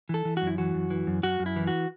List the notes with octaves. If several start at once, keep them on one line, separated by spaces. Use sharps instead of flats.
E3 A4
E3
F#2 F#4
E4
E3 F#4
F#2
E3
F#2
F#2 F#4
F#2
E4
E3
F#4